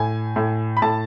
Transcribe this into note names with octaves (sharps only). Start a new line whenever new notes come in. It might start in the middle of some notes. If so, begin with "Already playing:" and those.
Already playing: A2 G#5
A2
B5
A2 A5